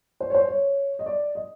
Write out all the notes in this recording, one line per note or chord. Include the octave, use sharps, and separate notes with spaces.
C5
C#5
C5
C#5
D#5
D5
D#5